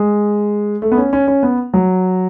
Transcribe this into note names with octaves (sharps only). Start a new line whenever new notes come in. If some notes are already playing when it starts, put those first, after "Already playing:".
Already playing: G#3
A3
B3
C#4
C#4
C#4
B3
F#3